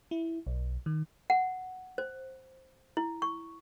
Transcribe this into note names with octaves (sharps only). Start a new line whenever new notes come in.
E4
B1
D#3
F#5
C5
E4
C#6